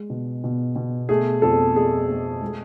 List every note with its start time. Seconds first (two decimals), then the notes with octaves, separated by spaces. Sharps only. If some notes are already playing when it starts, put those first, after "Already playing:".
Already playing: G#3
0.10 B2
0.44 B2
0.76 B2
1.09 A3 G#4
1.42 F2 A4
1.76 A3 G#4
2.09 A3
2.42 G#3